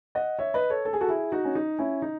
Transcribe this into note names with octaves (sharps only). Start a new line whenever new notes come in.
D#5 F#5
C#5 E5
B4 D#5
A4 C#5
A4
G#4
F#4 A4
E4 G#4
D#4 F#4
C#4
D#4
C#4 E4
D#4